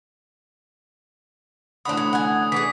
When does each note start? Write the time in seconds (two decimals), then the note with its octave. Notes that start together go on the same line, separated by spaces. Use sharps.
1.85 A1 D3 C4 F#4 B5 D#6
1.97 F#3
2.13 F#5 G#5
2.52 E3 D4 G#4 B6